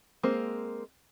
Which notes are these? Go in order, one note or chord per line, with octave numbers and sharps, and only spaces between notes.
G#3 A#3 C4